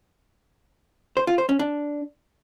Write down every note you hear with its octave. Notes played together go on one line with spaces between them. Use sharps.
C5
F4
C5
C#4
D4